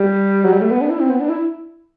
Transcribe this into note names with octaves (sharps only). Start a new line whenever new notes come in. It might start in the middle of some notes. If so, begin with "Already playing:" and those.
Already playing: G3
F#3
G3
A3
B3
D4
E4
C4
B3
D4
E4